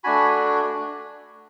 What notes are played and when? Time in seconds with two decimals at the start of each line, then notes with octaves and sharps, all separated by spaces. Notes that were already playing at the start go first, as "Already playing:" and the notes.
0.04 A3 D4 F#4 G#5 B5